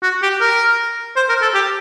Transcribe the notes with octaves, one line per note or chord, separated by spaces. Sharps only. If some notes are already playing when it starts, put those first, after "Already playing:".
F#4
G4
A#4
C5
A#4
A4
G4